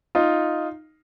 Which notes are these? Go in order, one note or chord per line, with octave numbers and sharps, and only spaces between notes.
D#4 F4